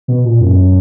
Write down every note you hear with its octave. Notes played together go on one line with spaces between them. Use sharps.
B2
A#2
F#2